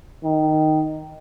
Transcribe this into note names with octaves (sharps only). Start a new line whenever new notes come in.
D#3